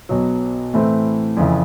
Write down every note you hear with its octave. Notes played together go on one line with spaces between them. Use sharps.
B1 B2 F#3
A2 E3 A3 C4
F2 C#3 E3